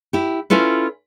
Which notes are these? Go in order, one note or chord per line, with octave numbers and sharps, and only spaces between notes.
E4 G4
C#4 E4 F4 A4 B4